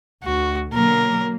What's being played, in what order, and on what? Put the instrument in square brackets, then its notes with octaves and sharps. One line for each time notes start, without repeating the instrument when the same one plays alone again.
[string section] D2 [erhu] F#4
[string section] B2 D3 F#3 [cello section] A#3 [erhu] A#4